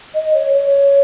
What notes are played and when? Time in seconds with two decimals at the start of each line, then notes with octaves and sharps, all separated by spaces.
0.15 D#5
0.34 C#5
0.54 C#5